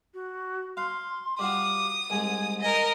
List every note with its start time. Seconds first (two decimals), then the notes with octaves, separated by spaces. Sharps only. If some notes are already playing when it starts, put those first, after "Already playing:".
0.14 F#4
0.77 F5 C6
1.39 G3 F4 F#4 D6 D#6
2.10 C2 G#2 G#5
2.61 A#4 D#5 G#5